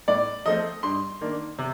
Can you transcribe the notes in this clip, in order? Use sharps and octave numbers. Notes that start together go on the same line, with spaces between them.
A2 D5
F3 A3 C4 D#5
G2 C6
D#3 A#3 D4
C3